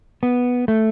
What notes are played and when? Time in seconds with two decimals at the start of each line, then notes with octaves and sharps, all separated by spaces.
0.23 B3
0.68 A3